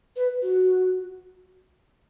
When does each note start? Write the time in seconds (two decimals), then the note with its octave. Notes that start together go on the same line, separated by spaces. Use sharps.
0.16 B4
0.42 F#4